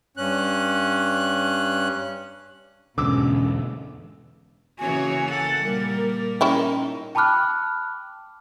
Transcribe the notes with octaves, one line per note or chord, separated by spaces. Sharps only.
G2 C#4 F#6
E2 G#2 B2 D3 C#4 D6 E6
C#3 E3 A#3 F#4 C#5 G#5
A4 F#5
A#2 G3 A#3 A#4
C#4 D#4 E4 A#4 G5
G5 A5 B5 D6 F6 F#6